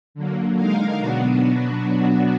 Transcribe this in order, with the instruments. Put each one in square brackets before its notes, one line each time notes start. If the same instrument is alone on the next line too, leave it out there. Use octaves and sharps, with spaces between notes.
[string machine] D3 F#3 A#3
D3 G#3 D#4 A#4 F5
B2 F#3 B3 D4 F#4